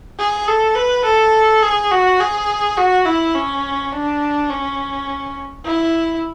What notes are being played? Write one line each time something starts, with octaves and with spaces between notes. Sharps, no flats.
G#4
A4
B4
A4
G#4
F#4
G#4
F#4
E4
C#4
D4
C#4
E4